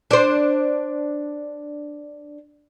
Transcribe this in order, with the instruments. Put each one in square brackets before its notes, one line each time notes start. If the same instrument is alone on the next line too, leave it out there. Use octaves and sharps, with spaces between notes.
[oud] D4 C5